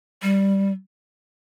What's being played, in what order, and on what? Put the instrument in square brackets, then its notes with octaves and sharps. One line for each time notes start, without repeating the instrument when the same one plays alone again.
[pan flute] G3